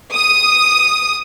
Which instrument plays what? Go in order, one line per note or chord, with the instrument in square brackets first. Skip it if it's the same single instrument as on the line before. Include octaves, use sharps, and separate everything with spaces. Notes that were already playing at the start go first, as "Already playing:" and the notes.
[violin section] D#6